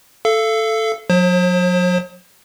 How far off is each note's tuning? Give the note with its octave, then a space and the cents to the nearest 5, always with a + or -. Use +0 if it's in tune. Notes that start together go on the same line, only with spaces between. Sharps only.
A4 +0 F5 -35
F#3 -35 C5 +35